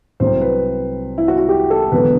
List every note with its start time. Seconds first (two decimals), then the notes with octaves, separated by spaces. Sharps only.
0.20 C2 C3 F#3 A3 C4 C5
0.41 B4
1.18 E4
1.28 F#4
1.38 F#4
1.49 G4
1.70 A4
1.92 E1 E2 D3 F#3 B3 B4